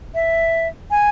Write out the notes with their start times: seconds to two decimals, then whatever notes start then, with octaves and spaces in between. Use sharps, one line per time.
0.14 E5
0.91 G#5